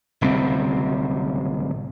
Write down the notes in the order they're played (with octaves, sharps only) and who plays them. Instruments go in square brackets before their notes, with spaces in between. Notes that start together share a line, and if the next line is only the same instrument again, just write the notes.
[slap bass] D1 C2 C#3 C4